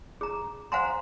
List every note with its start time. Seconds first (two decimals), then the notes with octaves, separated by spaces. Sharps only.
0.21 G#4 A#5
0.72 C5 F5 F#5 G#5 A#5 C6